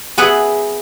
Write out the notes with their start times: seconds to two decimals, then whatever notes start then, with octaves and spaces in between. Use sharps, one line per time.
0.18 B3 G#4 B4 E5 F#5